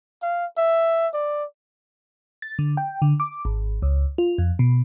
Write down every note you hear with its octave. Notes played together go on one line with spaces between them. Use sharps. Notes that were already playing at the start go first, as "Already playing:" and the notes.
F5
E5
D5
A6
D3
G5
D3
D6
G#1
C#2
F4
F2
B2